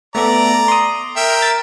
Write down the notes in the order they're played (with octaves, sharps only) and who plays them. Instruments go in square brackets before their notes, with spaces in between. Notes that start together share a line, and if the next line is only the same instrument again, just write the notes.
[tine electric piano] A3 B3 A4 [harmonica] D5 A#5
[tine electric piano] C6 D#6
[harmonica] A#4 E5 G5
[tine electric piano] A6